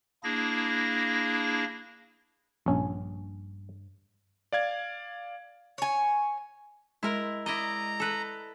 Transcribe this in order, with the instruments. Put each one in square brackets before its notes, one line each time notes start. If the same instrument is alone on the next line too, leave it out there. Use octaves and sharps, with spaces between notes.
[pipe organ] A#3 D4 E4 G#4 A#6
[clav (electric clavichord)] A#1 C#4 [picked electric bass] G2
[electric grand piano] D5 F5 G#6
[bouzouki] C#5 G#5
[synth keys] G#3 [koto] E4 A#4
[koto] E4 D5 D#5 [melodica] A#5
[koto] A4 B4